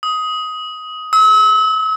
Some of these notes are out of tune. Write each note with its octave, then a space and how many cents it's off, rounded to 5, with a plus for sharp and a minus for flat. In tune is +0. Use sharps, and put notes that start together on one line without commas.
D#6 +15
E6 -40